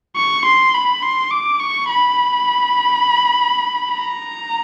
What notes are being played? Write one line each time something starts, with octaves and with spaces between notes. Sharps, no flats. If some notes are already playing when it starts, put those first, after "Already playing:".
C#6
C6
B5
C6
D6
C#6
B5
A#5